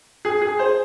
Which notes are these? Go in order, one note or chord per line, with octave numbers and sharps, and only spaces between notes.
G#4
G#4
C5